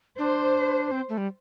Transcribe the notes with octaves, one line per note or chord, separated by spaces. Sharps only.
D4 C5
C4
A3
G3